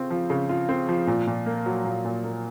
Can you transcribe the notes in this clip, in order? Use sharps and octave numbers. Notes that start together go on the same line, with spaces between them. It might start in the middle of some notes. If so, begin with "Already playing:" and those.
Already playing: C#3 C4 F4
F3
C#3
F4
C4
F3
A#2
A#2
A#3
F#3
A#2
A#2
A#3